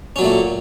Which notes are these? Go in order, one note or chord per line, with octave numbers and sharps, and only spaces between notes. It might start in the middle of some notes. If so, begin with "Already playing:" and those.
A#2 F#3 A3 C#4